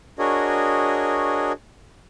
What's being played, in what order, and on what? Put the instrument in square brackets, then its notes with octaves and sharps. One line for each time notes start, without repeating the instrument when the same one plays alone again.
[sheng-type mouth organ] D4 F#4 G#4 A#4 C#5 D#5